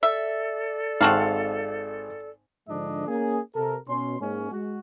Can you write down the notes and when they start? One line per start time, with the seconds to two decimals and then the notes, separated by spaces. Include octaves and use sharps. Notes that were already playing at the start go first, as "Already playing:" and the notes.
0.03 A4 D5 E5
1.01 G#1 C4 F#4 F5 A5
2.68 G#2 D3 F3 G#3 D4 D#5
3.07 A#3 C#4 G#4
3.54 C3 A4 A#4
3.87 B2 C#4 C6
4.19 G#2 G#3 A#3 C#4
4.51 G#3 F#4